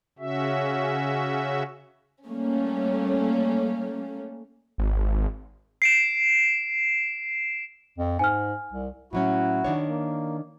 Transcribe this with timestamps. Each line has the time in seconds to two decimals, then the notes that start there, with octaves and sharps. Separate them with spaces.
0.19 C#3 C#4 F#4 E5
2.28 G3 A3 A#3 C#4
4.78 G#1
5.82 C7 D7 E7
7.98 F2
8.19 G#2 G#5 F6
8.72 C2
9.13 A2 F#3 C#4 E4 F#4
9.65 D#3 D4 C#5
9.88 A#3